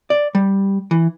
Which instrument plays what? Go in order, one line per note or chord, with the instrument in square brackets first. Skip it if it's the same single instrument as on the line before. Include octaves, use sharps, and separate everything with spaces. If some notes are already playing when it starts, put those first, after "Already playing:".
[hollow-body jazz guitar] D5
G3
E3